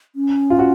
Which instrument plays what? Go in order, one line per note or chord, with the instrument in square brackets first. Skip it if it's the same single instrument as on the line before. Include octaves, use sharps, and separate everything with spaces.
[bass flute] C#4
[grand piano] F4
F#4